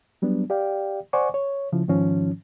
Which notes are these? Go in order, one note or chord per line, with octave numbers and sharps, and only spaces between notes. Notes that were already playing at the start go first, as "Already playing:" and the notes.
F#3 G3 B3 D4
G4 D5 F5 G5
C5 D5 F#5 G#5 C#6 D6
C#5
C#3 F3 E4
G#2 D#3 F3 C#4